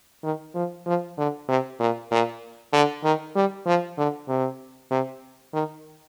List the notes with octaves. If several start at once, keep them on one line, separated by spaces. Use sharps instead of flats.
D#3
F3
F3
D3
C3
A#2
A#2
D3
D#3
G3
F3
D3
C3
C3
D#3